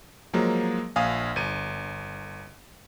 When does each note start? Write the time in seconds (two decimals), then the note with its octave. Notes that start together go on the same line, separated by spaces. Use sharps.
0.34 F3 F#3 G#3 A#3
0.96 A#1 F5 G#5 D#6
1.36 G1 D#7